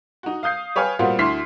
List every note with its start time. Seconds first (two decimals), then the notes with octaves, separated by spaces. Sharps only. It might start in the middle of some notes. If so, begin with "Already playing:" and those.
0.23 D#4 F#4
0.43 F5 D#6 G6 C7
0.76 B4 C#5 F5 G5 G#5 F6
0.99 A#2 G3 B3 C4 F4 F#4
1.19 D2 E4 C6 F6 B6 C7